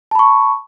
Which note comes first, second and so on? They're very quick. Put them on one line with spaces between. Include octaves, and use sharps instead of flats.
A5 B5 C#6